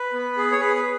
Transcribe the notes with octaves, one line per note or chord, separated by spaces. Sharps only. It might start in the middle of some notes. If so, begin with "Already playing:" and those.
Already playing: B4
B3
G#4
C#5
G#4 B4
B4